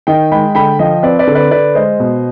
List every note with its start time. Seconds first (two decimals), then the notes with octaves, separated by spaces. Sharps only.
0.07 D#3 D#5 G5
0.32 G#3 G5 B5
0.55 D3 G5 B5
0.79 F3 D#5 G5
1.03 C4 B4 D5
1.19 B4 D5
1.27 D3
1.35 B4 D5
1.51 D3 B4 D5
1.75 G#3 C5 D#5
2.00 B2